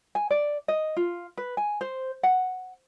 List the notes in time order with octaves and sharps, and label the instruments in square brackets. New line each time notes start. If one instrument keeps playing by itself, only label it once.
[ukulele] G#5
D5
D#5
F4
B4
G#5
C5
F#5